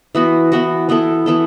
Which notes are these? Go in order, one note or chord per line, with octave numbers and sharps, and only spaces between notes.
E3 B3 F#4
E3 B3 F#4
E3 B3 E4 A4
E3 B3 E4 A4